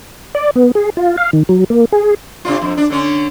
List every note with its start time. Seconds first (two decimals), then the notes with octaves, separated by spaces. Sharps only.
0.35 D5
0.56 B3
0.75 G#4
0.97 F4
1.18 F5
1.33 D#3
1.49 F#3
1.70 A#3
1.92 G#4
2.45 C3 D4 F4
2.62 F2
2.77 D4
2.90 D3 C#4